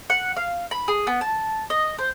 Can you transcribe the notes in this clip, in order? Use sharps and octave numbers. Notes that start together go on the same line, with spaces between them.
F#5
F5
B5
G#4
B3
A5
D#5
C5